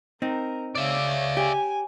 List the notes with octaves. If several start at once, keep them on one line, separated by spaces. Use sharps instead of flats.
C4 D#4 A#4
C#3 C#5 D5 E5
G4 G#5